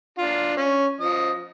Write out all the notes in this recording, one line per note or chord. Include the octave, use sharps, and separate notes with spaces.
D4 F4
C#4
F3 D#5